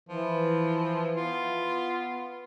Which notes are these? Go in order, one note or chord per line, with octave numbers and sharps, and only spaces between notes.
E3 F3
B3 F4